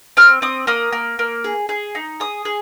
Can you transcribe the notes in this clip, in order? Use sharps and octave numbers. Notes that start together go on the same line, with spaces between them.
C4 F6
C4 D#6
A#3 D#6
A#3
A#3
G#4
G#4
D#4
G#4 D#6
G#4